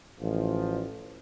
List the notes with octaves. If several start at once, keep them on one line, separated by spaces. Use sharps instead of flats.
A1 F3